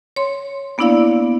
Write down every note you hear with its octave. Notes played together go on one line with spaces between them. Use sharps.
C#5 C6
A#3 B3 D4 E4 D5 F5